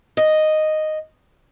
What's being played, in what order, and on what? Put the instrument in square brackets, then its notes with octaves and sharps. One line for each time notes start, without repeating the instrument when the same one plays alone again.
[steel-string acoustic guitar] D#5